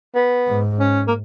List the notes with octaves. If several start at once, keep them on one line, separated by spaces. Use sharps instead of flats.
B3
G#2
C#4
A#3